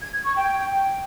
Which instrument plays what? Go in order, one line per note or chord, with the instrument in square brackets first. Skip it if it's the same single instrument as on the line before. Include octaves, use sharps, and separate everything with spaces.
[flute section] G#6
G#6
C#6
G5